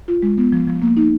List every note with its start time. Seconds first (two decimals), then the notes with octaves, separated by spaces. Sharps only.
0.08 F4
0.23 G#3
0.38 B3
0.52 F3
0.67 F3
0.82 A#3
0.97 D#4